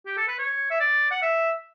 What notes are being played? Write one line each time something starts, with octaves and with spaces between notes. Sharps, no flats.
G4
A4
B4
C#5
E5
D5
F#5
E5